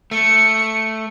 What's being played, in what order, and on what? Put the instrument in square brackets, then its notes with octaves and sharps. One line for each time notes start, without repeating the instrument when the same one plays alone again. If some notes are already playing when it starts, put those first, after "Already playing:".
[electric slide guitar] A3 [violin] C#7